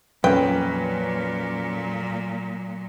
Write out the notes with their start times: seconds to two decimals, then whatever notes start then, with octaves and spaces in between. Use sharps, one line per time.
0.24 F2 A#2 F#3 C#4 B4 G5